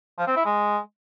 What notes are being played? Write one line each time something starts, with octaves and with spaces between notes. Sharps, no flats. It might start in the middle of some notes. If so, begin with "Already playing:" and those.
F3
C4
E4
G#3